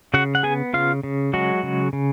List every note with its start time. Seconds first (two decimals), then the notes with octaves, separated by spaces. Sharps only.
0.14 C#3 F#4 F#5
0.35 F#5
0.43 B3 G#4 G#5
0.73 C#3 F4 F5
1.03 C#3
1.33 F#3 G#3 F#4
1.63 C#3
1.93 C#3